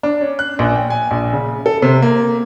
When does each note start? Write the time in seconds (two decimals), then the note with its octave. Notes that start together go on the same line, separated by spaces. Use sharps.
0.03 D4
0.21 C#4
0.39 F#6
0.59 A#1
0.75 G5
0.90 G#5
1.11 A#1
1.33 C#3
1.66 A4
1.82 C3
2.02 A#3